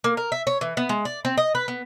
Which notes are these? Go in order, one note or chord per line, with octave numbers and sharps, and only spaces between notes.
A#3
A#4
E5
C#5
E3
B3
G#3
D5
C4
D#5
B4
B3